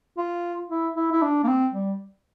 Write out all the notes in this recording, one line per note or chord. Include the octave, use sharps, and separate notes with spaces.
F4
E4
E4
E4
D4
A#3
C4
G3